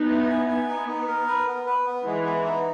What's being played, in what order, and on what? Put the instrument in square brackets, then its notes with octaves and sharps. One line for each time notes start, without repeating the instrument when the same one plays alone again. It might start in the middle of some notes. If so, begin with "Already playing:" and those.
Already playing: [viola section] B3 D#4
[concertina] E4
G#5
[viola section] B3 [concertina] G#5
[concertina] D#4
D#4
A#4
B4
B3
B4
B3
[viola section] E3 [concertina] G#3
[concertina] B3
D#4